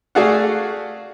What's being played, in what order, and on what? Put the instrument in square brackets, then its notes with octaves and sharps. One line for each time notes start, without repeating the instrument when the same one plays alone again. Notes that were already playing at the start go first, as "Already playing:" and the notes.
[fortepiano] A3 F#4 G#4 D5 F5 F#5